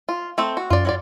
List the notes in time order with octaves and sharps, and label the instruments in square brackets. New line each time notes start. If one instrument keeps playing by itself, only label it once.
[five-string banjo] F4
A3 C4
F#4
[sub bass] F#2 [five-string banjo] F4 D5
[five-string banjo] F#3 F4 D5